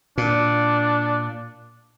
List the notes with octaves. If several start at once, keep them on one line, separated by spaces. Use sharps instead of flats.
A#2 D4